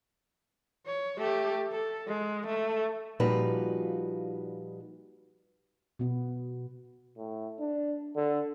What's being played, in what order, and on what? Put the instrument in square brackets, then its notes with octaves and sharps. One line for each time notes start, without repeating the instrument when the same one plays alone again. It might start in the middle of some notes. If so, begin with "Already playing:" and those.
[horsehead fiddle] C#5
A3 G4
A4
G#3
A3
[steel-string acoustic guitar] A#2 F3 G3 D#4 F#4 B4
[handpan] B2 B3
[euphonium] A2
D4
D3